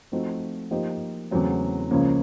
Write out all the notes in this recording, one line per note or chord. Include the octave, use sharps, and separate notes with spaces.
F3 A3 C4 D#4 F#4
F3 A#3 D#4 G4 C5
E2 C#3 F#3 A3 C4
C#2 C#3 F3 A#3 C#4